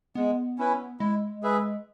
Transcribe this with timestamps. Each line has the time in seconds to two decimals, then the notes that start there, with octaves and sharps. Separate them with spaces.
0.15 G#3 B3
0.58 C#4 E4 B4
1.00 G#3 E4
1.43 G#4 B4 E5